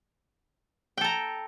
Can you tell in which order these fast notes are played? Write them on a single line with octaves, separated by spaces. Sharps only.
G5 A4 A#5